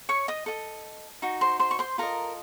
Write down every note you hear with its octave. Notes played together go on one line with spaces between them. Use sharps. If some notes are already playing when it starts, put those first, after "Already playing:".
C#5 C#6
D#5 D#6
A4 D#5
D#4 F#4
C5 C6
C5 C6
C#6
C5 C6
F4 A4 A#4 D#5 A#5